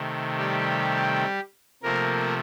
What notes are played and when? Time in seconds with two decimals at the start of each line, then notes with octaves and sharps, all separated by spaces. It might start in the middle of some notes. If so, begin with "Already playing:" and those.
Already playing: C3 D#3 A3
0.37 G3 G4
1.83 C3 F3 A3 A#3 A#4